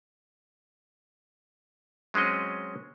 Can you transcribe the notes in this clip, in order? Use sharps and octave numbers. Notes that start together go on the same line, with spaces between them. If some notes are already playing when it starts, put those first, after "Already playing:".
F#3 G#3 C4 C#4 D#5